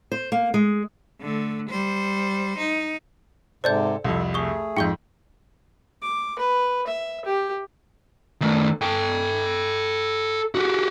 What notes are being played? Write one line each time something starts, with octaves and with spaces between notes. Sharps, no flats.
C5
A#3
G#3
D3 A3
G3 C5
D#4
G#2 C3 A4 C5 D5 G6
C2 F2 A4
A3 G#4 C#6 D#6
F2 G#2 G5 C#6 G6
D6
B4
E5
G4
D#3 A3
A4 G5
F#4 G4